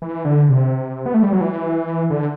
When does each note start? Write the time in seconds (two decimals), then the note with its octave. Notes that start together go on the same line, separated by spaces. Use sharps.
0.02 E3
0.25 D3
0.49 C3
1.06 B3
1.14 A3
1.23 G3
1.32 F#3
1.41 E3
2.10 D3